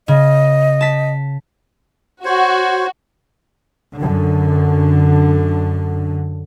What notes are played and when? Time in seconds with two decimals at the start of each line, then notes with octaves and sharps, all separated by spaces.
0.08 C#3 D#5
0.81 A5 B6
2.25 F#4 C5 C#5
3.97 F#2 D3